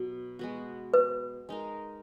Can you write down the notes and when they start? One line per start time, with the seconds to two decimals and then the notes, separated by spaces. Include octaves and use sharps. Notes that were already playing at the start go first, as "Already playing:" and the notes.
Already playing: B2 F#3
0.39 G#3 B3 F#4
0.94 B4
1.49 G#3 D#4 A#4